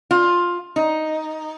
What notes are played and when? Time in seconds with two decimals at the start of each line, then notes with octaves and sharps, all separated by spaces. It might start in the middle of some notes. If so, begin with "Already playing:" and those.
0.11 F4
0.76 D#4